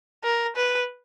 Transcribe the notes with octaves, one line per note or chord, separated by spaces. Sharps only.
A#4
B4